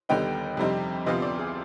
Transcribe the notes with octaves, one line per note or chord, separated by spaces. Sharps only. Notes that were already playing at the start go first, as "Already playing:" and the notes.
D#2 D3 G3 B3 D#4 G5
F2 C3 G3 C4 D#4
D2 C3 F3 B3 F4 D#5
D5
G#4